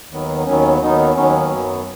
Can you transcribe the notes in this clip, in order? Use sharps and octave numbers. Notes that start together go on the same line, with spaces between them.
D#2 D#3 F#3 B3
D#2 D#3 F#3 B3 C#4
D#2 D#3 F#3 B3 D#4
D#2 D#3 F#3 B3 C#4
F#2 F#3 B3